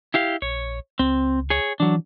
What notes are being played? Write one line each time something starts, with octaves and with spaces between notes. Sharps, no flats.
E4 G4 F5
A#1 C#5
C#2 C4
G#4 C#5
E3 F#3 D4